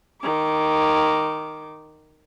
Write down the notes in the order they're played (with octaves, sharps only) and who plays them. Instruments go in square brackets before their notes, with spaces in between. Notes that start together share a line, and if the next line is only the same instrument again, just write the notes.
[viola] D#3 D6